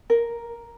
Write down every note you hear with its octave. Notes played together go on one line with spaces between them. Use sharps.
A#4